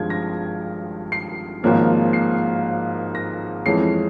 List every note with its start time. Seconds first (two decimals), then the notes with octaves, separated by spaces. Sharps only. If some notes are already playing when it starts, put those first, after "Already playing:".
Already playing: G#1 G2 F3 G#3 G#6
0.10 A#6
1.12 C7
1.63 G#1 G#2 F3 A#3 C#4
2.13 C7
3.15 A#6
3.65 F2 E3 G#3 C#4 C7